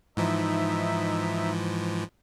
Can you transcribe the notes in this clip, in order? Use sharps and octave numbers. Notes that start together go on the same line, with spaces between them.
G#2 E3 F3 D#4 E5